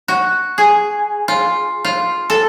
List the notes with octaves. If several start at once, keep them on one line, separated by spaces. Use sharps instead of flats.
F#4
G#4
F4
F4
A4